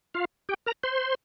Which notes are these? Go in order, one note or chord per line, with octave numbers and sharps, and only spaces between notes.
F4 F5
G4 G5
A#4 A#5
C5 C6